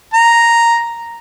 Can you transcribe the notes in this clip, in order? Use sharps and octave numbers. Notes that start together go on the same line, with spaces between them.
A#5